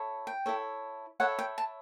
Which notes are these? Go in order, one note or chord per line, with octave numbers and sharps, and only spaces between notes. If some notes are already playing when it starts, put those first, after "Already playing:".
Already playing: E4 A4 C#5
G5
E4 A4 C#5
E4 A4 C#5 F#5
G5
A5